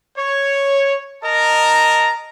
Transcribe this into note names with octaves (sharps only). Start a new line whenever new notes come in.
C#5
A#4 D#5 A5 A#5